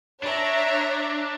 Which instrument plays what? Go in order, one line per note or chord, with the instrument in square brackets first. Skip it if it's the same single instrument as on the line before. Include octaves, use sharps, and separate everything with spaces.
[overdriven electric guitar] D4 [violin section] C#5 E5 A#5